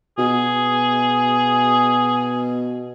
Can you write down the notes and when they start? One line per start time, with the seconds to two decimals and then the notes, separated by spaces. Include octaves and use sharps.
0.18 B2 G#4